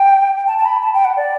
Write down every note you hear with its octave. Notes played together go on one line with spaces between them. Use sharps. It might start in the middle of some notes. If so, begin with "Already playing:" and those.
Already playing: G5
A5
A5
B5
A5
G5
F#5
D5